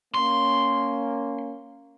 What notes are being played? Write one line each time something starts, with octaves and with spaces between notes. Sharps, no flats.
A#3 C#4 C6